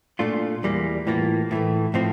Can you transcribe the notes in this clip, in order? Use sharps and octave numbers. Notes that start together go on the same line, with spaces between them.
A#2 A3 D4 F4
E2 E3 G3 A#3
A2 E3 A#3 F4
A2 E3 A3
A2 F3 C4